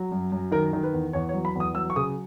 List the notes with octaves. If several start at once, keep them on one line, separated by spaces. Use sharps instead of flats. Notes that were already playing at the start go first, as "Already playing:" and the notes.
Already playing: F#3
F#2
F#2
D#3 A#4
D#3
B4
E2
E2 C#5
C#5
F#3
B5
E2 D#6
F#3 E6
C#6
C#3 D#6